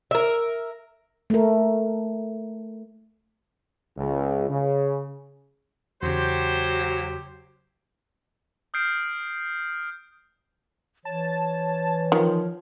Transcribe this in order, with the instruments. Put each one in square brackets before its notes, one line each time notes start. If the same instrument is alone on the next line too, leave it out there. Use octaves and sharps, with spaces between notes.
[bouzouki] A#4 E5
[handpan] A3 A#4
[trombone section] C#2
C#3
[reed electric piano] E2 C#3 [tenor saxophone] F#3 [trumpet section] G4 C5
[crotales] D#6 F6 G6 C7 D7
[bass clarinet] E3 [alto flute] C#5 [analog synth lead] A5
[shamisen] D#3 [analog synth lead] F3